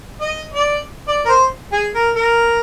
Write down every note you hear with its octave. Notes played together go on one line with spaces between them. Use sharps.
D#5
D5
D5
A#4
C5
G#4
A#4
A#4